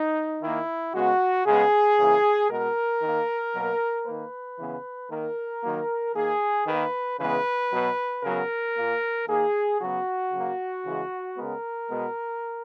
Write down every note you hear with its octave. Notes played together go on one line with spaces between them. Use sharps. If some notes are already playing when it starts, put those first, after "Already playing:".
Already playing: D#4
D#3 A#3 E4
C#3 G#3 B3 F#4
C#3 G#3 B3 G#4
C#3 E3 A#3
B2 G#3 B3 A#4
D#3 A#3
B2 F#3 A#3
D#3 A#3 B4
C#3 E3 B3
D#3 A#3 A#4
D#3 F#3 A#3
D#3 A#3 G#4
D#3 A#3 B4
C#3 E3 G#3 B3 B4
B2 F#3 B3
C#3 F#3 B3 A#4
A#2 A#3
D#3 A#3 G#4
C#3 F#3 B3 F#4
C#3 F#3 A#3
C#3 E3 G#3
C#3 G#3 B3 A#4
B2 G#3 B3